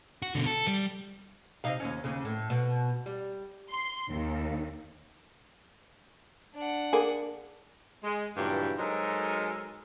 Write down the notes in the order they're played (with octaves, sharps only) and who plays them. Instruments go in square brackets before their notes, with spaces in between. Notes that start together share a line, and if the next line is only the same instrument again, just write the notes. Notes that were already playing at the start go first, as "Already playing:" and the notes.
[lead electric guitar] F#4
B2 D3
A4
G3
[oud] C3 D#4 F5
D#2 C#3 C#4
D#2 C#3
A2
B2
G3
[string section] C6
D#2
[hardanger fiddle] D4 F#5
[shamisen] A#3 G#4
[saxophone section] G#3
G2 A#2 C#3 E3 F#3 G3
F#3 G#3 D#4 A4 A#4 C5